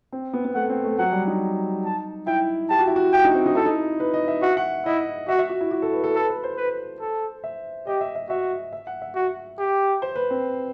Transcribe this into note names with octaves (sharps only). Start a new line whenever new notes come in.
C4
B3
B3
A3 F#5
C4
A3
F#3 F#5
G3
D#4
A5
E4 G5
G4 A5
F#4
E4
F#4
E4 G5
D#4
C4
D#4
E4 A4
D#4
B4
D#5
E5
F#4 E5
F#5
E4 D#5
F#4 E5
E5
F#4
E4
F#4
A4
B4
A4
A4 B4
B4
C5
B4
A4
E5
G4 D#5
E5
E5
F#4 E5
E5
F#5
E5
F#4
G4
C5
B4
C4